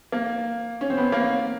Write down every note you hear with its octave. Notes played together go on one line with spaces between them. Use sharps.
A#3
C#4
C4
B3
A#3